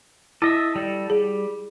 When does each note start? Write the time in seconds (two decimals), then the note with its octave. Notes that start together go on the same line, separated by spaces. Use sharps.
0.42 E4 A4 D#5 E5
0.76 G3 A4
1.10 G3 G#4